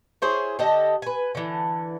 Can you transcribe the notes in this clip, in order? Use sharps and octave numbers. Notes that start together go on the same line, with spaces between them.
E4 G#4 C5 C#5
D3 G4 A4 D#5
B4 G#5
D3 E3